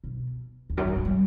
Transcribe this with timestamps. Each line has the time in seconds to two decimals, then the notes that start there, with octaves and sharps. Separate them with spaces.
0.04 B2
0.70 E2
0.77 F#2
0.87 G2
0.96 A2
1.05 G3